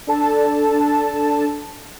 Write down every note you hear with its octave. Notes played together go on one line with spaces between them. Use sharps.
D4 A4 A5